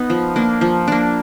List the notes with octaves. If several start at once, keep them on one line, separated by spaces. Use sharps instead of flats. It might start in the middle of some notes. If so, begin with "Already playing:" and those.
Already playing: B3 D#4
F3
A#3 D4
F3
A#3 D4